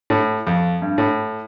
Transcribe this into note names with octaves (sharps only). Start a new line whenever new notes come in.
A2
F2
G2
A2